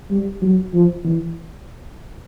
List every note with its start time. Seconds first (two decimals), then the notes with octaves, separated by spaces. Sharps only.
0.10 G3
0.42 F#3
0.74 F3
1.05 E3